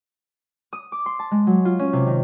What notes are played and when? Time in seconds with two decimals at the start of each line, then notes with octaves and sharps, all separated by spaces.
0.73 D#6
0.92 D6
1.06 C6
1.19 A5
1.31 G#3
1.47 F#3
1.65 F4
1.79 C#4
1.93 C3
2.07 D#3